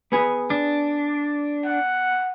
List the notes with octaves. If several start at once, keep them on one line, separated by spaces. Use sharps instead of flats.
B3 G#4
D4
F#5